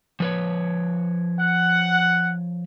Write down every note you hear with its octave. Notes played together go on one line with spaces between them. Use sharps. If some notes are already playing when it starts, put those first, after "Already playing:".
F3 B4 C#5
F#5